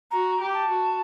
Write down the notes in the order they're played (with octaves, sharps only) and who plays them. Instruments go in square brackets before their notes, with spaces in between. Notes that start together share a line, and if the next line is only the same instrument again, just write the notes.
[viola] F#4 [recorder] A#5
[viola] G4
[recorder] A5
[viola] F#4